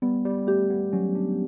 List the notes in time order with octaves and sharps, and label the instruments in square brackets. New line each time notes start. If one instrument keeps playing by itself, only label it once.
[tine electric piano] G3 [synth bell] B3
[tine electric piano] G3
[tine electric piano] A3 [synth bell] G4
[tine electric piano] B3
[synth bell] F#3 [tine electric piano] C#4
[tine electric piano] D4